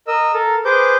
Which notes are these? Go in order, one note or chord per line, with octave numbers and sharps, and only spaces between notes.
A#4 D#5 E6
A4 A#4
G#4 B4 C5 D6 G6